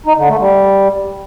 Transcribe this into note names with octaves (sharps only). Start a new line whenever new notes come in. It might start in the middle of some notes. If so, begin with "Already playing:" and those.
D#4
D3
A3
G3